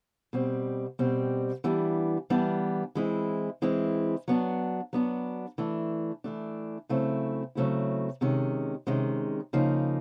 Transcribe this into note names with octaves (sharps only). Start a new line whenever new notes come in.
B2 G3 C4
B2 G3 C4
E3 G3 B3 D4
E3 G3 B3 D4
E3 G#3 C4 E4
E3 G#3 C4 E4
F#3 B3 D4
F#3 B3 D4
E3 A3 D4
E3 A3 D4
C#3 F#3 A3 C4 E4
C#3 F#3 A3 C4 E4
C3 D#3 G#3 C#4
C3 D#3 G#3 C#4
C#3 F3 A#3 D#4